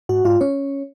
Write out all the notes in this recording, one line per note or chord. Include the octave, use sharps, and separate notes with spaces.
G#2 F#4 F#5
G#2 F4 F5
C#4 C#5